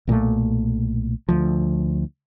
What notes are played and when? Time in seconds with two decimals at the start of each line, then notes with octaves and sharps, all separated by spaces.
0.07 B1 A#2 F#3 A3
1.29 D2 F3